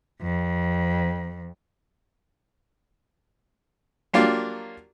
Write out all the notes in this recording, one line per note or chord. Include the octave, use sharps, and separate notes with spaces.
F2
F#3 A#3 D4 F4 G4